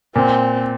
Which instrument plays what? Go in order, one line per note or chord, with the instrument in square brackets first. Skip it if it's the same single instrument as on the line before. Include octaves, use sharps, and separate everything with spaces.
[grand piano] A#2 [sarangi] C4